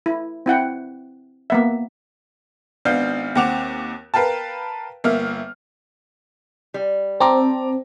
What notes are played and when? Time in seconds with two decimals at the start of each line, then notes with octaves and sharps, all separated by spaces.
0.06 E4
0.46 C4 E4 F#5 G5
1.50 A#3 B3 E5
2.85 G#1 B3 D4 F5 G6
3.35 D#2 C4 F#5 D6 E7 F7
4.14 A#4 B4 F5 G5 A5
5.04 G1 A#3 E5 F6
6.74 G3
7.20 C4 A5 A#5 D6